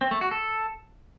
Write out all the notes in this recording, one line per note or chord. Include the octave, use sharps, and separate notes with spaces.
C4
A3
F#4
A4